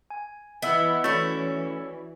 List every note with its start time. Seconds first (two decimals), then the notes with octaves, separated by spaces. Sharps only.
0.10 G#5
0.62 E3 B3 E4 D#5 E5 E6
1.04 E3 A3 C#4 E4 F#4 D5